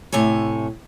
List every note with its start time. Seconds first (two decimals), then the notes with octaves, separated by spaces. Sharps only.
0.12 A2 C3 C#5 G#5